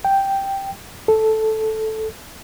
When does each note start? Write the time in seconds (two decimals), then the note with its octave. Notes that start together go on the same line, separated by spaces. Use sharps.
0.05 G5
1.08 A4